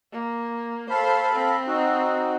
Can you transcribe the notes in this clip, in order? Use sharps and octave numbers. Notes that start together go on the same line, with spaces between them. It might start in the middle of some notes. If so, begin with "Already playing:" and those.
A#3
A4 C5 F5 B5
C4
D#4 F#4